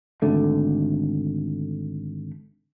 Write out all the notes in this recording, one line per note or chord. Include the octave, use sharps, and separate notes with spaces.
G#1 D3 A3